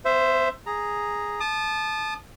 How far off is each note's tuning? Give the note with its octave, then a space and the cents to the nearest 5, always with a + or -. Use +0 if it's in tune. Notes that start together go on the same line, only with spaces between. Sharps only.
B3 +40 C5 -5 E5 +15
G#4 +0 A#5 +0
A5 -20 D#6 -35